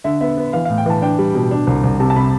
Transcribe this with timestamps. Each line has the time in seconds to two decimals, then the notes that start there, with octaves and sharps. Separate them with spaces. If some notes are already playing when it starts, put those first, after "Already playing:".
0.04 D3 E5
0.21 B3 E5
0.37 B3
0.53 E3 F5
0.65 A2 F5
0.78 G5
0.86 E3 A5
1.02 D4 G5
1.19 G3
1.35 B2
1.51 D4
1.67 C2
1.83 C2
2.00 C3 A5
2.10 A5
2.16 C3 B5